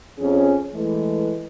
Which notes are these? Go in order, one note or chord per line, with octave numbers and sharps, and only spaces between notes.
F2 C#4 G#4
E3 G#3 A3